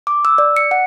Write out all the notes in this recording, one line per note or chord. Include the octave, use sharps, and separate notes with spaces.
D6
E6
D5
C#7
F#5